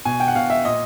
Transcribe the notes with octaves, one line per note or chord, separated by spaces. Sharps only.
B2 G#5
G5
F#5
B2 F5
E5
A#2 D#5